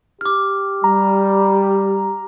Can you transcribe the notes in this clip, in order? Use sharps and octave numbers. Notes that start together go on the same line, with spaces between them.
G4 D6 F6
G3 A#5